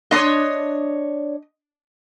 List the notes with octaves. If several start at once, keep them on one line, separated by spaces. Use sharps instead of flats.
D4 C#5 D#5 C6 D#6